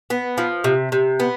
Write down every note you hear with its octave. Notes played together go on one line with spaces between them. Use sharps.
B3
F3
C3
C3
B3